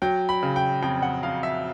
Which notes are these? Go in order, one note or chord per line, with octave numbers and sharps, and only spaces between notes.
F#3 G5
B5
C#3
G5
F2 G5
F#5
F2 F5
E5